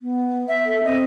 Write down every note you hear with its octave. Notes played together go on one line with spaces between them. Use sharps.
B3
E5
A4
C4 D#5